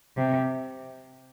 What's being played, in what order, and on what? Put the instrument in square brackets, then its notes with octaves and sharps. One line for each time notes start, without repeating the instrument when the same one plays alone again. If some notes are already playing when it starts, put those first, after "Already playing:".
[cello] C3